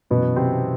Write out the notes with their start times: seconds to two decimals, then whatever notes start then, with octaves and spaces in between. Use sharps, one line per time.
0.10 F#2 B2 E3 B3
0.36 C3 C4